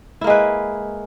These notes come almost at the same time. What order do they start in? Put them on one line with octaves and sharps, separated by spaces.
E4 A#3 G#3 B4